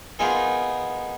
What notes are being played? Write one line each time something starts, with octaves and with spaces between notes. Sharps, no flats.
B3 D#4 F4 G#4 A#4